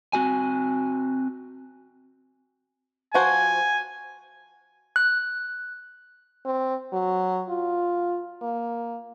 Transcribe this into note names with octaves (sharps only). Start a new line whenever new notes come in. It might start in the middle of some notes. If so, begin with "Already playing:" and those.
C4 F#4 G#5
F3 F#4 C5 G#5
F#6
C4
F#3
F4
A#3